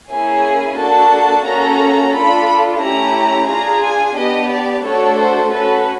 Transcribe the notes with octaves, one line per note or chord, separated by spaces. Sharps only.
A#3 C#4 E4 G#4 G#5
A#3 D4 F#4 A4 A5
A#3 C#4 F#4 A4 A#5
D4 F4 A4 B5
A3 C#4 E4 G4 A#5
D4 F4 G#4 A#5
G#5
B3 D4 G4 D#5
D5
A3 D4 F#4 A4 C#5
C5
C#4 F#4 A4 B4